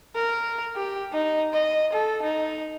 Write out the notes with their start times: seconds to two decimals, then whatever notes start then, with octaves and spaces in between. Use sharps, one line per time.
0.15 A#4
0.76 G4
1.13 D#4
1.53 D#5
1.93 A4
2.23 D#4